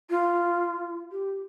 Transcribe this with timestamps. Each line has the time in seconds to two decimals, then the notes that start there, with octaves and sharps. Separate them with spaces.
0.10 F4
1.12 G4